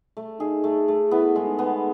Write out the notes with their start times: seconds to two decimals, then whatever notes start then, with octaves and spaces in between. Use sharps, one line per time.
0.17 A3
0.40 D#4 G#4
0.64 A3
0.88 A3
1.11 B3 E4
1.36 G#3
1.47 D#4
1.59 B3